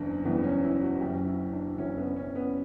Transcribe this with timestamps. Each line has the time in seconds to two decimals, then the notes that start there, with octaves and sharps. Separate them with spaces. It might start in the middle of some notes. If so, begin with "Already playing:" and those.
Already playing: F#1 E2 C#3 D4
0.25 F#1 E2 C#3 E3 G3 B3
0.44 C#4
0.64 E4
0.82 F#4
1.01 F#1 F#2 E3 G4
1.26 E4
1.53 D4
1.77 F#1 F#2 E3 C#4
1.98 B3
2.16 C#4
2.35 B3